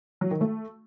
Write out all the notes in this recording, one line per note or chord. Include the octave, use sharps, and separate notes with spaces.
F#3
D#3
A3